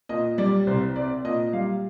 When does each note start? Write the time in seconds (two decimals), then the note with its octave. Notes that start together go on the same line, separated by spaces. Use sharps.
0.09 A#2 D#5
0.38 G3 D5
0.67 C2 C5
0.96 C4 D5
1.24 A#2 D#5
1.53 G3 F5